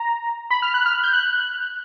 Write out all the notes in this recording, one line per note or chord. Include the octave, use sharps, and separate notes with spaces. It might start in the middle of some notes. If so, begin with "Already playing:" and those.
Already playing: A#5
B5
F6
F#6
F6
G6
F#6